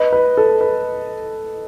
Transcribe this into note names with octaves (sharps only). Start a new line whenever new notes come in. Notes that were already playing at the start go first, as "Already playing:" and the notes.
Already playing: B4 D#5
B4
A4
B4